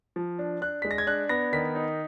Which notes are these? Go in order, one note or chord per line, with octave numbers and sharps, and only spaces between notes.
F3
D4
D4 F#6
G#3 B6
A#6
G#6
D4 F#6
B3 A#6
D#3 B6
D#4